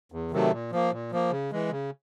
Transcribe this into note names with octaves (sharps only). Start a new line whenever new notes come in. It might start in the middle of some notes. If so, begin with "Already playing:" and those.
E2
C3 D#3 F#3 A3
A#2
F3 A#3
A#2
F3 A#3
C#3
E3 G#3
C#3